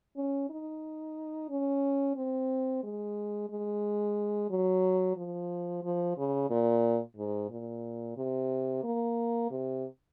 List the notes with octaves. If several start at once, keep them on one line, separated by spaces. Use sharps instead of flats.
C#4
D#4
C#4
C4
G#3
G#3
F#3
F3
F3
C#3
A#2
G#2
A#2
C3
A#3
C3